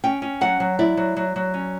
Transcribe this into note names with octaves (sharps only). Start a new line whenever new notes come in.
C#4 G5
C#4
F#3 F#5
F#3
E4 D5
F#3
F#3
F#3
C#4